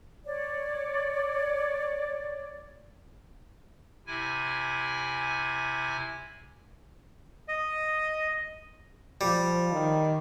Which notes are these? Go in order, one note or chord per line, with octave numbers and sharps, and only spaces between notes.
C#5 D5
C3 E4 G#5
D#5
F3 G3
D#3